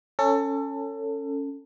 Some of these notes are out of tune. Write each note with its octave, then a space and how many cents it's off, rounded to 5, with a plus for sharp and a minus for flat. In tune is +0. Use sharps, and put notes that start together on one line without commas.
C#4 +0 A4 +25